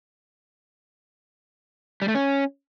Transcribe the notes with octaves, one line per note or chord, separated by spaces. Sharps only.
G3
A3
C#4